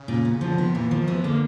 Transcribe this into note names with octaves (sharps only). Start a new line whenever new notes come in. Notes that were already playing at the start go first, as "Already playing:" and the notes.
Already playing: C#3
A#2
B3
F3
D3
D#3 B3
A#2 E3
D#3 F3
D#3
E3 B3
D3 A#3